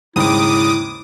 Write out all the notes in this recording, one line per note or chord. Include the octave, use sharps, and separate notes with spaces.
D#2 G#2 C#3 E4 D6 D#6